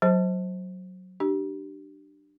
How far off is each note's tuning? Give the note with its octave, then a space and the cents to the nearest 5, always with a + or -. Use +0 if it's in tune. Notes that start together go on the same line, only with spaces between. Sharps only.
F#3 +0 C5 +0 A5 +0
D4 +25 G4 -25